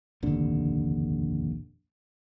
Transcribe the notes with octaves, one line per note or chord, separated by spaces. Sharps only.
F1 A#1 D#2 D3